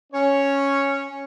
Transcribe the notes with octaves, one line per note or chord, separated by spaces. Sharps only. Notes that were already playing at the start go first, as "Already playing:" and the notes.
C#4 C#5